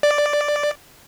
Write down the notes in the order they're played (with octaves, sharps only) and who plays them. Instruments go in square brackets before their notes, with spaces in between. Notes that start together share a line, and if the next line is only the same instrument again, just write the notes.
[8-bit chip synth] D5